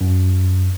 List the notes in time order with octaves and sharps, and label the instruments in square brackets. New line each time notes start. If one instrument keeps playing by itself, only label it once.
[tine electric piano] F#2